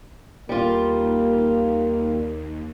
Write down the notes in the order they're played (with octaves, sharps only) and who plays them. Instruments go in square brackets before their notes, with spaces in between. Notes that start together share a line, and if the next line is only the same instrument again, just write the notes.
[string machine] D#2 [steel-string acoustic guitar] G3 F4 [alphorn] A#3